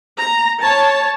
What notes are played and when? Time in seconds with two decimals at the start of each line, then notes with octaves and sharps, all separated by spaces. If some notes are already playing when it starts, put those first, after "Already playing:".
0.19 A#5
0.63 C#5 A5